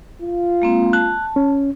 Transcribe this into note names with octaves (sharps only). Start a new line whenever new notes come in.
F4
G#3 A#3 C4
A5 F#6
C#4